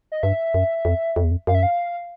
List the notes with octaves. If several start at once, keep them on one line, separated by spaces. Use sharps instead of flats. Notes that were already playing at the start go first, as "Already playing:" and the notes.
D#5
G2 E5
F#2
F2
F2
E2
F2
F#2 F5
E5
F5